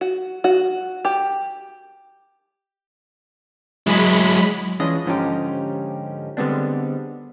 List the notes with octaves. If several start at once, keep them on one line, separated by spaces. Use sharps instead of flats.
F#4
F#4
G4
F#3 G#3 E4 B5
E3 G#3 C#4 D4 F4 D#5
G#2 D3 F3 C#4 D#4 G4
D3 G3 G#3 B3 C4 D4